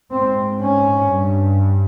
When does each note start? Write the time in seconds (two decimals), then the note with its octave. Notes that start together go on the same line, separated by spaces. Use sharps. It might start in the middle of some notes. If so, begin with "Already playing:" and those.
0.12 G#2 C4
0.61 C#4
1.08 G2